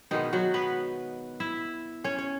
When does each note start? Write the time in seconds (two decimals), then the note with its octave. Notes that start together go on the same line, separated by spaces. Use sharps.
0.11 B2 D#3 G#3 B3 D#4
0.33 F#3 F#4
0.54 B3 B4
1.40 E4 E5
2.04 C#4 C#5
2.18 C#5